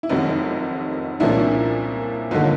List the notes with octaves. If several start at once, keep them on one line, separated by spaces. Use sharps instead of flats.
E4
F1 F2 C3 D#3 F#3 D#4
C2 A#2 F3 A#3 C#4 D4 E4
G1 D3 F#3 A#3 D#4 F4